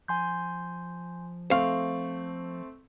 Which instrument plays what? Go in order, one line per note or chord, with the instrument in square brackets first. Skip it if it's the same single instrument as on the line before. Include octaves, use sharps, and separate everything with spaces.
[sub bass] F3 [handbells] G#5 C6 G6
[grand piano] A3 C4 [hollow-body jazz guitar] F5 [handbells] C#6